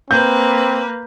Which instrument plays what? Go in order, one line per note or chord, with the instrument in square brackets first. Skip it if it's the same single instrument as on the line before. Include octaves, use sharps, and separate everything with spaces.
[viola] A#3 B4 [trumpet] C4 [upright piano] G6